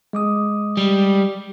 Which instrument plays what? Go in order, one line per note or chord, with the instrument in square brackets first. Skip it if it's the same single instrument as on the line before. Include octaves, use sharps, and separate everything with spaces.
[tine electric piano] G#3 D6 D#6
[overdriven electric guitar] G3